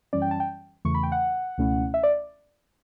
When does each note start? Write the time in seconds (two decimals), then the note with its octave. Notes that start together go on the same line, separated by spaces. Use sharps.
0.13 F#2 E3 G3 C#4 D5
0.22 G5
0.31 A5
0.40 G5
0.85 E2 C#3 E3 A3 C#6
0.94 B5
1.03 G5
1.12 F#5
1.58 C#2 B2 A3 C#4 E4
1.94 E5
2.03 D5